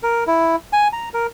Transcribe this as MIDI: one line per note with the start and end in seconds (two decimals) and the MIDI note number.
0.03 0.24 70
0.27 0.56 64
0.73 0.88 80
0.93 1.09 82
1.14 1.27 70